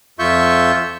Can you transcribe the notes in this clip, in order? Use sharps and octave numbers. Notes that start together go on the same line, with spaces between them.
F2 F4 E5 C#6 G6